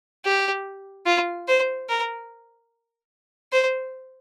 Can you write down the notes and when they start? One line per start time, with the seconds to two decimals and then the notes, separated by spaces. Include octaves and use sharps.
0.25 G4
1.06 F4
1.48 C5
1.89 A#4
3.53 C5